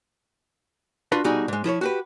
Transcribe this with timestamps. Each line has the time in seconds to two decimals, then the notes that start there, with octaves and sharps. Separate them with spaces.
1.12 D4 F4 F#4 B4 F5
1.24 B2 G3 D#4 F#4 G#4
1.48 G#2 G#3
1.64 F3 E4 C5 C#5
1.81 F#4 G4 B4